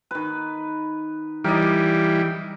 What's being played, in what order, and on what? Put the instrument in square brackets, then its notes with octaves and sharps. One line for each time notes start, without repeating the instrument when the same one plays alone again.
[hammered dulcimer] D#3 B4
[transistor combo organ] E3 G3 [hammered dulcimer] A#4 D5 D#5